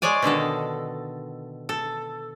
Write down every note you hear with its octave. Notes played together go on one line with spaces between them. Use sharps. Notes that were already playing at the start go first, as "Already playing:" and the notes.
G#3 G#4 C#5 D5 G#5
B2 D3 D#3 A4
A4